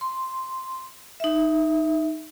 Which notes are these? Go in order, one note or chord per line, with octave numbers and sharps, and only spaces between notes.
C6
D#4 E5